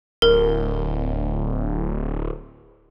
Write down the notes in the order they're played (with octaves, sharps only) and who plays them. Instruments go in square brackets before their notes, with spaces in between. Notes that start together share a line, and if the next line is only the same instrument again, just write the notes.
[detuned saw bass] D1 [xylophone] A#4